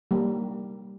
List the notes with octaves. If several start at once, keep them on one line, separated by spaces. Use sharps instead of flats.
G3 A#3